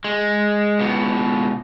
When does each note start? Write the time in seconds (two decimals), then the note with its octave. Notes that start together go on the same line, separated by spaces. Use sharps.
0.04 G#3
0.79 C#2 B2